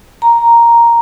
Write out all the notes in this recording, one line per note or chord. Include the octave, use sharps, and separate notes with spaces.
A#5